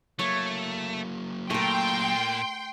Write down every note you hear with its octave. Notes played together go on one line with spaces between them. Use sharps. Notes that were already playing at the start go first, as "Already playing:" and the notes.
F#3 A3 A#3 C#5
A#2 A3 A#4 G5 C6